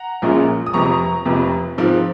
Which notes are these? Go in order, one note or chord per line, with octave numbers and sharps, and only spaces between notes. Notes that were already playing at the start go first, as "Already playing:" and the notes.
Already playing: F#5 A#5
A#1 A#2 G#3 C#4
D#6
F1 F2 C3 A#5 C#6
F1 F2 C3
G#2 F3 C4